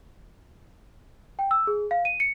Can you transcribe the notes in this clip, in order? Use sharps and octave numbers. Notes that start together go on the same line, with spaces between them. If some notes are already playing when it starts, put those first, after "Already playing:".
G5
E6
G#4
F5
D#7
C#7